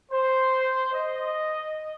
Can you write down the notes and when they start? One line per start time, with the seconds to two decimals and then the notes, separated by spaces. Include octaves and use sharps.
0.12 C5
0.93 D#5